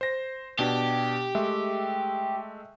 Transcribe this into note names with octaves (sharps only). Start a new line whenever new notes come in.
C5 A#6
B2 D4 G4
G#3 A3 E5